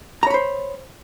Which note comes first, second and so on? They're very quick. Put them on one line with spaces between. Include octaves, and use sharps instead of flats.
A#5 C#5 B5 C5